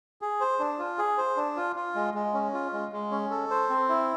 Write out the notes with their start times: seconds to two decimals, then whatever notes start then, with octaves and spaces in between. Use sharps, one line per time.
0.22 G#4
0.41 C5
0.60 D4
0.79 F4
0.98 G#4
1.18 C5
1.37 D4
1.56 F4
1.76 F4
1.95 G#3
2.14 G#3
2.34 C#4
2.54 F4
2.73 G#3
2.92 G#3
3.11 C#4
3.30 A4
3.50 C5
3.70 C4
3.89 E4